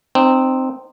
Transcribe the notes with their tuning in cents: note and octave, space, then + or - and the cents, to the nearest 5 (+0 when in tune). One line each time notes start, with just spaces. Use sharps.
C4 +0 D#4 -30